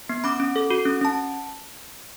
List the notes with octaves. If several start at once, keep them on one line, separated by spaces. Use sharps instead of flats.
B3
C#4 B5 D6
C#4
A4
F#4
C#4
C#4 A5